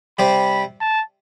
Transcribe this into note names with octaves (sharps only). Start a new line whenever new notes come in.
C3 G3 C4 G4 C5 B5
A5